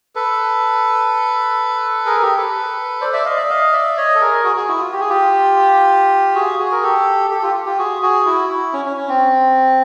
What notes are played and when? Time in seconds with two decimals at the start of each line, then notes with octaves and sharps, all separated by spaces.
0.15 A4 B4
2.06 G#4 A#4
2.22 G4 A4
2.38 A4 B4
3.01 C5 D5
3.13 D5 E5
3.25 D#5 F5
3.37 D5 E5
3.49 D#5 F5
3.72 D5 E5
3.97 C#5 D#5
4.15 A4
4.21 G#4 A#4
4.44 F#4 G#4
4.56 F#4 G#4
4.68 E4 F#4
4.80 F4
4.92 G4
5.01 G#4
5.09 F4 G4
6.35 F#4 G#4
6.59 F#4 G#4
6.72 A#4
6.83 G4 A4
7.30 G4 A4
7.43 F4 G4
7.54 F4
7.65 F4 G4
7.78 F#4 G#4
8.02 F#4 G#4
8.26 E4 F#4
8.49 E4
8.73 C#4
8.86 C#4
8.97 C#4
9.09 C4